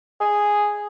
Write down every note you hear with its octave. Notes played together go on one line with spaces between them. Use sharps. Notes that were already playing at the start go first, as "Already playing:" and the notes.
G#4